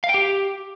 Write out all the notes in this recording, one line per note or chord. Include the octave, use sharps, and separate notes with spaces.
F5
G5
G4